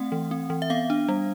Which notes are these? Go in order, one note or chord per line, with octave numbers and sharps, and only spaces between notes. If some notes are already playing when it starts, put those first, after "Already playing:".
Already playing: A3 C4 F#5
E3
C4
E3
E5
B3 F5
D4
G3